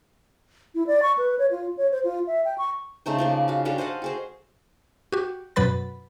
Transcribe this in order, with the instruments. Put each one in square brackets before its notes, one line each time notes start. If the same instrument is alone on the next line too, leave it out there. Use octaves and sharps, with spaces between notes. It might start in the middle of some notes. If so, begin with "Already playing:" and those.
[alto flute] E4
D5
C#6
B4
C#5
F4
C#5
C5
F4
E5
G5
C#6
[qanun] C#3 A3 D#4 C5
C#3 F3 A#3
F#4 F5
G3 D4 F#4 A4
C5 D#5 F5 F#5
F#4 G#4 C5
[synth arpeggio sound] F#4 G4
F#2 B2 F#3 B4 B5 A6